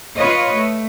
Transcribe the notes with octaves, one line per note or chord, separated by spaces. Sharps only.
F4 B4 C#5 D#5
A3